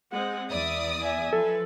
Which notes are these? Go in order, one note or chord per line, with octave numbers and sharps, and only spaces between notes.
G#3 C4 F#5
E2 D5 E5 D#6
E5 G#5
F3 A4 B4